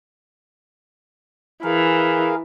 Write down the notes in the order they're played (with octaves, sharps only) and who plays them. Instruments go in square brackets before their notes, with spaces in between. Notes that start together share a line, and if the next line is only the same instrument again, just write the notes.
[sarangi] E3 [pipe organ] G#4 A#4 F5